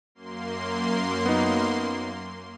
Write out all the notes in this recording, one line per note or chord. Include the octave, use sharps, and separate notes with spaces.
F#2 A#3 C6
B3 D#4